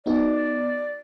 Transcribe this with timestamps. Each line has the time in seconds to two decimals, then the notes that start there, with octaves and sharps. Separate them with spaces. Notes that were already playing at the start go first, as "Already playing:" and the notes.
0.06 B3 D#4 F#4 D5